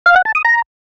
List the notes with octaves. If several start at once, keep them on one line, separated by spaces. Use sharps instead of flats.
F5
F#5
A5
D#6
A#5